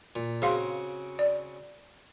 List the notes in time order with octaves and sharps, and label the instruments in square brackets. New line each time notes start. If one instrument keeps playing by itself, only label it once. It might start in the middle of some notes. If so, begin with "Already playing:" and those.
[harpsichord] A#2
[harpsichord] C#3 C4 F#4 [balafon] G#4 F5 C6
[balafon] D5